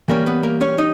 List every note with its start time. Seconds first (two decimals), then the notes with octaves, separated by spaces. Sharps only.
0.08 E3 G3 A#3 C#4 A#4
0.26 B3 B4
0.43 A#3 A#4
0.61 C#4 C#5
0.78 D#4 D#5